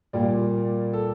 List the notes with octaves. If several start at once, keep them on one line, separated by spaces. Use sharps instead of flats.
A#2 G3 A#3 D5
A4